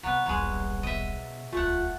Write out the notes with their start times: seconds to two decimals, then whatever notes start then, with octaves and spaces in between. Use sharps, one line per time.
0.03 C3 D#3 F#3 B3
0.26 D#1 B1 F#3 G#3
0.83 B2 D#5 E5
1.52 D#1 C#2 A3 F4 F#5